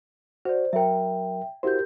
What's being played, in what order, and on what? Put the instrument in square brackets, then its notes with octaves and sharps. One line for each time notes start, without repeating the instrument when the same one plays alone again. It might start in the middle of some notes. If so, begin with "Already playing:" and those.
[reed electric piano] F#4 [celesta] C5 D5
[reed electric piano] F#3 A#4 [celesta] E5 G5
[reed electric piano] E4 F#4 C5 [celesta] G4 A#4 G6